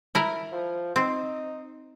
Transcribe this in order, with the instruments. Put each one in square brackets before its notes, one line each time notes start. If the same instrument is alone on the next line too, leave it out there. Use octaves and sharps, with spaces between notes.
[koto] E4 A#4
[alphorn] F3
[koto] C4 [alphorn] D#4